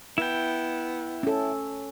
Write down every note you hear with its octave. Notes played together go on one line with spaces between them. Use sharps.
B3 E4 G5
C#4 A4